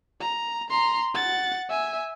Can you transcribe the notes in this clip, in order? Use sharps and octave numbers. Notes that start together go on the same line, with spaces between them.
A#5
A#5 C6
F#5 A6
E5 G#5